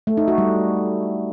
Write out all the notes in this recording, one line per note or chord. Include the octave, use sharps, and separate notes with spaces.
A3
D#4
F#4
G3